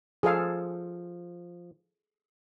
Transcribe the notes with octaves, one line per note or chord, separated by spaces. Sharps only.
F3 G#4 A4 F5